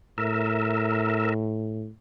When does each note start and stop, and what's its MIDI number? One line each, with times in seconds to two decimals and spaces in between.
0.18 1.88 45
0.18 1.34 70
0.18 1.34 76